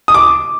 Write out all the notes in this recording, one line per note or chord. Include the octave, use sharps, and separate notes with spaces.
D#6
D6